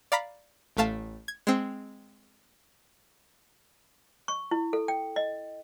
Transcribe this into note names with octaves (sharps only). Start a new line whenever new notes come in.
D5 F5 A#5 B5 B6
A1 A2 A3 F5 A5
G#6
G#3 C4
C#6
E4
A4
G5
D#5